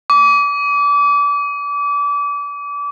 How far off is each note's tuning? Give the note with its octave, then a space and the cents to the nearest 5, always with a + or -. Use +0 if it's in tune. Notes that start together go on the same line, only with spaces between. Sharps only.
D6 -30